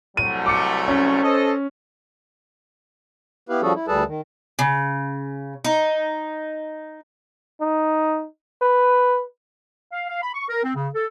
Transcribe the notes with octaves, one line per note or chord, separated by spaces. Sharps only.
C2 F#3 A3 D#7
D6 C#7
C#4
A4 C5 D#5
B3 E4 G4 B4 F5
F3 G3 C#4 F#4 G#4 A4
E4
D2 G3 G#4 A4 B4 A5
D#3
C#3
D#4
D#4
B4
F5
F5
B5
C#6
A#4
C4
C#3
A4